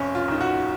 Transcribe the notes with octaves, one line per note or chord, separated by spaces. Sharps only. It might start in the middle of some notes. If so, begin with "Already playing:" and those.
Already playing: F1 C#4
F4
D#2 D#3
F#4